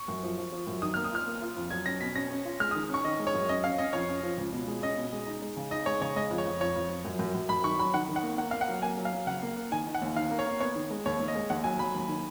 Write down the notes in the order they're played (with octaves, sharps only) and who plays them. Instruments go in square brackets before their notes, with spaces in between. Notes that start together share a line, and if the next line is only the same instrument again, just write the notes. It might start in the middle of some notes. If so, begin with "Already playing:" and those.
Already playing: [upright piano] C#6
[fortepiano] F#2
F3
F3
F3
F#2
[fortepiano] D#3 [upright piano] D#6
[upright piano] F6
[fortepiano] A#3
[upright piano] D#6
[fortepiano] F4 [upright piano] F6
[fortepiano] A#3
F4
F2
[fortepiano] F#3 [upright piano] G#6
[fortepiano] C#4 [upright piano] A#6
[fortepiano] B2 [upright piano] B6
[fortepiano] C#4 [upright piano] A#6
[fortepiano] C#4
F4
[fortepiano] G#3 [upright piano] F6
[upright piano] D#6
[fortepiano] D#3
[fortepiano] C#4 [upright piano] C#6
[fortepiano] D#3 [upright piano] D#5
[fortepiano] G#3
[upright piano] C#5
[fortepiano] F#2
[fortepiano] C#4 [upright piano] D#5
[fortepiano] C#4 [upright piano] F5
[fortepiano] C#4 [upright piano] D#5
[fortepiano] F2 [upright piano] C#5
[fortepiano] C#4
F3
C#2
B2
G#3
[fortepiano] C#4 [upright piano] D#5
[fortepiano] B2
G#3
D#4
G#3
C#3
[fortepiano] D#4 [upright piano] D#5
[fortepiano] G#3 [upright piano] C#5
[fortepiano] C#3 [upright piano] C#5
[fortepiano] G#3 [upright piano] D#5
[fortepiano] F2
[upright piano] C#5
[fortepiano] F2
[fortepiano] F2 [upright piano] C#5
[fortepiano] F2
F3
F#2
F#2
F#2
[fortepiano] F#2 [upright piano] B5
[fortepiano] D#3 [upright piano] C#6
[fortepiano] F#3 [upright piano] B5
[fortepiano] D#3 [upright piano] F#5
[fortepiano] D#3
[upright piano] F#5
[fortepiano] A#3
[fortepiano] A#3 [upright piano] F#5
[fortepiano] A#3 [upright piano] F5
[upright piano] F#5
[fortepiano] F#3
[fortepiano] A#3 [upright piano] G#5
[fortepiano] F#3
[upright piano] F5
[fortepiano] F#3
[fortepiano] C#3 [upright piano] F#5
[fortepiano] A#3
A#3
[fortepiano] D#3 [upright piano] G#5
[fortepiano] D#4
[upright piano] F#5
[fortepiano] D#2
[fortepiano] D#3 [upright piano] F5
[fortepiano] A#3
[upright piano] C#5
[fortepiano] A#3
[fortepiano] B3 [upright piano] C#5
[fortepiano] D#3
G#3
[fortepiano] D#2 [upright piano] C#5
[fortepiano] D#2
[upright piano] D#5
[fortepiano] G#3
[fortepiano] D#2 [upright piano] F#5
[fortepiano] F#3 [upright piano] G#5
[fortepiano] F#3 [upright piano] B5
[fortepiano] D#2
D#3